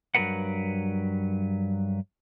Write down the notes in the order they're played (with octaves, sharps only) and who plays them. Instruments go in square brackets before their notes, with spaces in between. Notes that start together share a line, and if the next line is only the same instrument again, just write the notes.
[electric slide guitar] G2 F#3 E4 A#4 B4 F#5